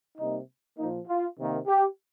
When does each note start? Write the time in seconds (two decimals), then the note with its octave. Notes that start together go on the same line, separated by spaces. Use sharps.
0.18 C3 G3 A#3 D#4
0.78 A#2 F3 A#3 D#4
1.08 F4
1.37 C3 D#3 A#3
1.67 G4